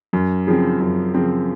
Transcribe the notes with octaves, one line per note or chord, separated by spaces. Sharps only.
F#2
C#3 F3 C4
F#2
C#3 F3 C4